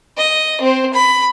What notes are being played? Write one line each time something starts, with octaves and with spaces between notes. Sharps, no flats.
D#5
C4 C5
B5